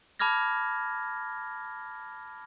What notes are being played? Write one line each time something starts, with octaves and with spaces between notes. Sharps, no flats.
A5 B5 D6 F6 G#6 A#6